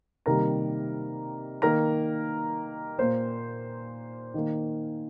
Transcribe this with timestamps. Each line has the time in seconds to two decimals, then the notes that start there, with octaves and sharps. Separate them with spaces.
0.26 C3 D#3 G3 A#3 A#4 A#5
1.62 D#3 A#3 A#4 A#5
2.98 A#2 A#3 C5
4.34 D#3 A#3